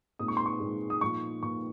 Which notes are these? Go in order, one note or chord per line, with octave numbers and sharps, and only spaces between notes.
A#2 G#3 C4 D#4 D#6
C#6
C6
C#6
A#2 G#3 C4 D#4
D#6
A#2 F3 A#3 D#4 C#6
A#2 F3 A#3 D#4 C#6